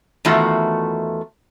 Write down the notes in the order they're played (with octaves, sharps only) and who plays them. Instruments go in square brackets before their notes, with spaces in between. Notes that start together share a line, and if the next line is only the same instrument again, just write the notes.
[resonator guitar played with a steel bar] E2 D#3 A3 F4 F#4